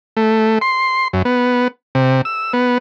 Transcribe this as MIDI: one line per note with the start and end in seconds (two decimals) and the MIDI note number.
0.17 0.59 57
0.61 1.08 84
1.13 1.22 42
1.25 1.68 59
1.95 2.22 48
2.25 2.53 88
2.53 2.78 59